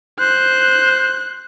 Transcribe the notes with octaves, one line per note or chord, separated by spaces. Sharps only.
C5 F#6